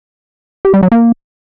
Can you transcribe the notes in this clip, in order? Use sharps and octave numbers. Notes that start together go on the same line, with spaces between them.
G4
G3
F#3
A#3